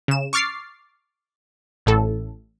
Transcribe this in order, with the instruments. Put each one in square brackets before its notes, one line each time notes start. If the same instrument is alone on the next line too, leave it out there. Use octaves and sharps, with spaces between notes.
[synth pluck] C#3 E7
C#6 D6 F6 A6 C7
A1 A2 A4